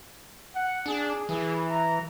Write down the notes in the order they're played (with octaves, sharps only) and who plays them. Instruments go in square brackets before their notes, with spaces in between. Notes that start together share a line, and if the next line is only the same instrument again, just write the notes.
[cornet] F#5
[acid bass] D4 [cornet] G#4
[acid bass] E3 [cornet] G#4
[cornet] A#5